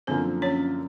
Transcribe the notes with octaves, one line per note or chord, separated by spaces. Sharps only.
F#2 D3 F3 A#3 C4 C5
C#4 C#5